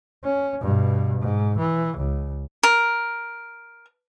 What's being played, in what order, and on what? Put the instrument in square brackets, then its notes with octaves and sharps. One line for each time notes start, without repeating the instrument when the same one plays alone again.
[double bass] C#4
G2 B2
G#2
E3
C#2
[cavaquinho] A#4